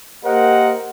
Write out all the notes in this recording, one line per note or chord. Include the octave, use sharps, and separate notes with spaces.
A#3 G4 A#4 C5 D#5 F#5